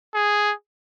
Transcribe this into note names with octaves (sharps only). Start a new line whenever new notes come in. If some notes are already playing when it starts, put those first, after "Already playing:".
G#4